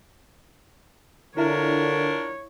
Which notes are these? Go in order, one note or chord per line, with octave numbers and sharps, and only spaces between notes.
D3 D4 E4 F4 A#4 C#5 E5